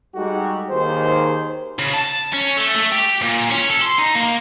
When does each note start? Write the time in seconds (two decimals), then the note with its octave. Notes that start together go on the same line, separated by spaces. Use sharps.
0.15 G3 G#3 D#4 F#4 G4 A4
0.70 D#2 D#3 G4 G#4 C5
1.79 C#3
1.93 A5
2.33 C#4
2.57 A3
2.76 A3
2.92 G4
3.22 A#2
3.50 C#4
3.69 A4
3.82 C6
3.98 D#4
4.15 A#3